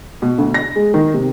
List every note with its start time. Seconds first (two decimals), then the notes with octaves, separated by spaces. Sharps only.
0.22 B2
0.38 D2
0.54 A#6
0.76 G#3
0.94 D#3
1.14 C3